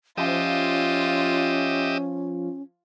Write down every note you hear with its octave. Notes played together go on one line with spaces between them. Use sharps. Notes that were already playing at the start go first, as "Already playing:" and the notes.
F3 C#4 F4 G4 D#5 E5